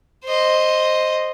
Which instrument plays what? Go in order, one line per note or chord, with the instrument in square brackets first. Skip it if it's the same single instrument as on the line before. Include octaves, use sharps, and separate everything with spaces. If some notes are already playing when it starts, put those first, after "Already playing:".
[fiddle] C5 D#5